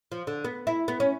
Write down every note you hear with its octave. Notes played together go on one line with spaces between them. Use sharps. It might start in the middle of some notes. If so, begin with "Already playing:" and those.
F3
D3
B3
E4
B3
C#4